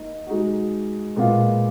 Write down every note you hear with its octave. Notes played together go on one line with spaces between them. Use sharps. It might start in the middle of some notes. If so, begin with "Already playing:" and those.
Already playing: A#3 D#4 D#5
G#3 D#4 F#4
A#2 G#3 B3 F4